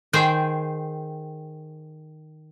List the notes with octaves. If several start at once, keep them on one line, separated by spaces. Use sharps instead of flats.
D#3 G#4 C5 G5